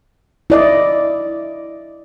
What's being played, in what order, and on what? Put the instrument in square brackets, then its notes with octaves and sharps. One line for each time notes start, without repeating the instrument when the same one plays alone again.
[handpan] E4 D5 D#5